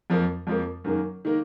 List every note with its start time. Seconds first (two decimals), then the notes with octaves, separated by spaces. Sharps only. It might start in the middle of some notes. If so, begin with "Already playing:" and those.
0.10 F2 F3 A#3
0.47 F2 F3 A#3
0.84 F#2 D#3 A#3
1.25 D#3 A#3